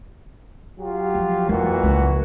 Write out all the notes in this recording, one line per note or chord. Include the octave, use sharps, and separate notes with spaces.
F#3 F4 G4
F3
F2 A#2 E3 F#4
C#2